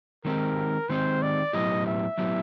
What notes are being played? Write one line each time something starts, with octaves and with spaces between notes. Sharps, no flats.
D#3 G#3 C4 D#4 G4 A#4
D#3 G#3 C4 D#4 G4 C5
D5
A2 F#3 B3 E4 G4 D#5
E5
A2 F#3 B3 E4 G4